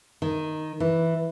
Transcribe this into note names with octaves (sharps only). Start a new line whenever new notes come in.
D#3
E3